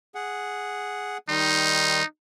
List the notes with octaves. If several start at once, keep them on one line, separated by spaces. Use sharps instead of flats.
G#4 F#5
D#3 G3 D#4 C6